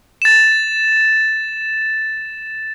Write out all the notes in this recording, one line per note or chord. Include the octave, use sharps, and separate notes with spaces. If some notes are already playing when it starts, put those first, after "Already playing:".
A6 E7